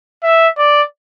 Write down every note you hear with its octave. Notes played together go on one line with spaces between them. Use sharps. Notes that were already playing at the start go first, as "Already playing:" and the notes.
E5
D5